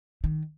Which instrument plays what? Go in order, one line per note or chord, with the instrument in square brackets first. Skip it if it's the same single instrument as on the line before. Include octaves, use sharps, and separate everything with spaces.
[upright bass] D#3